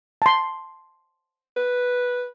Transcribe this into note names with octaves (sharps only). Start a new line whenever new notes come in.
A5 C6
B4